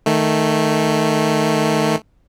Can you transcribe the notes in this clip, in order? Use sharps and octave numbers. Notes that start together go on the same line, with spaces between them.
D#3 A3